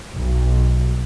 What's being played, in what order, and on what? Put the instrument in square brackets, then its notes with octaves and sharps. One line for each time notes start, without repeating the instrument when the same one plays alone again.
[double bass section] B1